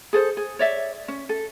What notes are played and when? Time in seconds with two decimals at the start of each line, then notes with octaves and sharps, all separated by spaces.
0.13 G#4 A4 C5
0.37 G#4
0.59 C#5 D5 E5
1.08 C#4
1.29 A4